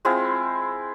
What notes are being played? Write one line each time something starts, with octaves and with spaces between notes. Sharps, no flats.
G#3 C4 E4 F4